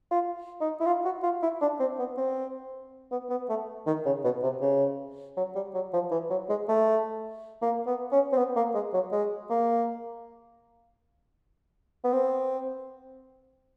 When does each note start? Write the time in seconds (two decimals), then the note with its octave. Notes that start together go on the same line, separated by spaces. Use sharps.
0.11 F4
0.61 D#4
0.80 E4
0.86 F4
1.05 F#4
1.23 F4
1.42 E4
1.61 D4
1.80 C4
1.99 B3
2.17 C4
3.11 B3
3.30 B3
3.49 A3
3.86 D#3
4.05 C#3
4.24 B2
4.43 C3
4.61 C#3
5.37 F#3
5.55 G3
5.74 F#3
5.93 F3
6.11 E3
6.30 F#3
6.49 G#3
6.68 A3
7.62 A#3
7.87 B3
8.12 C#4
8.32 C4
8.37 B3
8.56 A#3
8.74 G#3
8.94 F#3
9.12 G#3
9.50 A#3
12.04 B3
12.13 C4